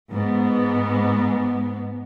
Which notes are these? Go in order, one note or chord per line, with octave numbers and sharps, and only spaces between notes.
G#2 B3